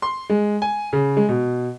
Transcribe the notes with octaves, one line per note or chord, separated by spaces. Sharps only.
C6
G#3
G#5
C#3
G#3
B2